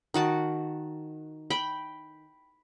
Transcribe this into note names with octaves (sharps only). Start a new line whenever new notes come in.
D#3 F#4 A5
G5 B5